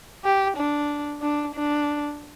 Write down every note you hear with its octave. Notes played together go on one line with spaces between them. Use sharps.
G4
D4
D4
D4